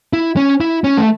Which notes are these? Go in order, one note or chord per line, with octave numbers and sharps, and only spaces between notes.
E4
C#4
E4
C#4
A3